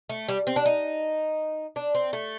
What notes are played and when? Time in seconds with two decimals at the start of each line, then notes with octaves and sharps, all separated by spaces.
0.09 A3
0.29 G3
0.47 C4
0.56 D4
0.66 D#4
1.76 D4
1.95 C4
2.13 A3